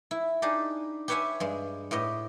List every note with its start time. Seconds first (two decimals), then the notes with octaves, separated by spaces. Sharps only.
0.11 E4
0.42 D4 D#4 G4 G#4
1.08 G4 B4 C#5 E5 F#5 G#5
1.40 G2 G#3
1.91 A2 B3 G4 D#5